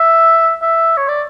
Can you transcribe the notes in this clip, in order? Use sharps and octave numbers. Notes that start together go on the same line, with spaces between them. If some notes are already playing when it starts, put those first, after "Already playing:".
Already playing: E5
E5
C#5
D5